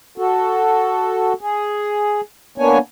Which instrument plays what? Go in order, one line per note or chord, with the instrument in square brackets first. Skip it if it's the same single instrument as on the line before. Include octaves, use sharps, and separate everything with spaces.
[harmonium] F#4 A4
G#4
A#3 B3 D4 C#5 G#5